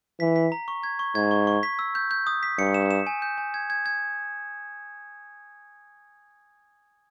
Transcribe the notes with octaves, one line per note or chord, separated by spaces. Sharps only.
E3 B6
B6
A#5
C#6
G#6
C#6
G#2 G#6
C#6
C#6
B6
E6
G6
G6
D#6
B6
G2 C#7
E7
E7
G#5
G6
G#5
G#6
G#6
G#6